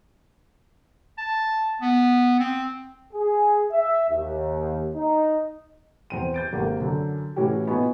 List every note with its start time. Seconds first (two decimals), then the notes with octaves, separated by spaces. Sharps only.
1.18 A5
1.81 B3
2.39 C4
3.13 G#4
3.72 E5
4.10 D#2
4.95 D#4
6.10 E2 C4 D#7
6.34 G6 A6 D7
6.53 G#1 A#3 G4
6.80 F#2 D3
7.36 A2 E3 C#4 F#4 G4
7.67 A#2 B3 D#4 G#5 C#6